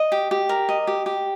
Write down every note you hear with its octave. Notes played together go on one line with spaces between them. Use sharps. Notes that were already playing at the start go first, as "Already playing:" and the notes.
Already playing: D#5
G4
G4
A#4
D#5
G4
G4